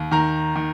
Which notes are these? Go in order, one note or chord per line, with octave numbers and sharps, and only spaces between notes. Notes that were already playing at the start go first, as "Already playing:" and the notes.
Already playing: D#2
D#3 A#5
D#3